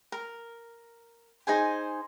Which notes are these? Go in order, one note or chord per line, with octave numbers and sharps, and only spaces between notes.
A#4
D#4 G#4 C5 G#5